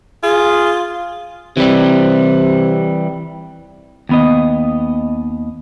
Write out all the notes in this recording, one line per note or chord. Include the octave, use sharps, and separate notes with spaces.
F4 G#4
C3 E3 G3
D#2 B3 D#5